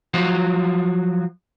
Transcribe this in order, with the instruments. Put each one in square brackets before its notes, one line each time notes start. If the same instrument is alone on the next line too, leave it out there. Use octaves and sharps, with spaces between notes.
[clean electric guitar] F3 F#3 F#4